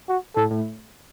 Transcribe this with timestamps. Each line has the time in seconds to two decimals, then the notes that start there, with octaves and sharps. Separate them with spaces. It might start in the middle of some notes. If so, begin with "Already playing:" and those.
0.09 F#4
0.36 A2 A4
0.51 A2